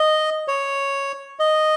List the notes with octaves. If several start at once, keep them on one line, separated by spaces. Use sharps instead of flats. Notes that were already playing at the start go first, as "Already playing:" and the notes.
Already playing: D#5
C#5
D#5